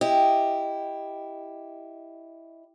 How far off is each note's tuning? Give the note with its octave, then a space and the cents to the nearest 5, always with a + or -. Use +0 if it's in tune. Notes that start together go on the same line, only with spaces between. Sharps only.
E4 +0 G4 +0 D#5 +0